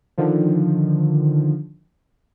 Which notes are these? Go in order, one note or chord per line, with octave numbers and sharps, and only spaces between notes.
D3 D#3 F3